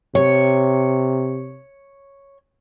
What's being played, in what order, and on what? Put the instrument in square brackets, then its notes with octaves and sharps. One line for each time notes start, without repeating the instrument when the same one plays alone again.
[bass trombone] C3 [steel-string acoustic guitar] C#5